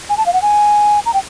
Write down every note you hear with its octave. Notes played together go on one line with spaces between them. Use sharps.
G#5
A5
F5
F#5
G#5
A#5
G5